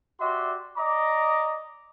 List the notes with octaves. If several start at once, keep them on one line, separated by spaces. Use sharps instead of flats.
F#4 G4 D5 E5 C6
D5 D#5 A#5 D6